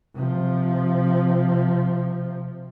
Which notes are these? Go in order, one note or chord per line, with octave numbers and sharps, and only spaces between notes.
C3 F3